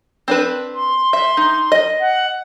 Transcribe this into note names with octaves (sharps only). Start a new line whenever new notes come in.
C4 D4 B4
C6
E5
D#4
D#5
F#5